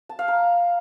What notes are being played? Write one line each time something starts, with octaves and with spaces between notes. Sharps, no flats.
A5
F5
A#5